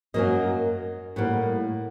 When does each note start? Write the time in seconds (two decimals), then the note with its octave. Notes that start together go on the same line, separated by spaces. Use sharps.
0.14 F#2 F#3 A#3 D#5
1.16 A2 G3 A#3 F#5